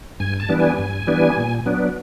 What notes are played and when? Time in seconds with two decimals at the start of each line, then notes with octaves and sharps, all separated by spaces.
0.20 G2 G#5
0.40 A5
0.49 E3 G3 B3 D4
0.60 G#5
0.78 G2
1.07 E3 G3 B3 D4
1.37 A#2
1.66 F#3 B3 D4